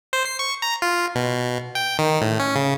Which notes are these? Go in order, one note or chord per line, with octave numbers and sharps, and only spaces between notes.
C5
C7
C#6
A#5
F4
B2
G5
D#3
A2
C#4
C#3